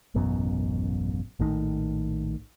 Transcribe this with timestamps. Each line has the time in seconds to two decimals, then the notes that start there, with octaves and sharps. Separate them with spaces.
0.14 D#1 A1 F#2 B2
1.39 A#1 A2 D#3